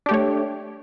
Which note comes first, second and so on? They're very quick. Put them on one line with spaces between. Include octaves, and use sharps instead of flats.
D4 G4 A3 C#5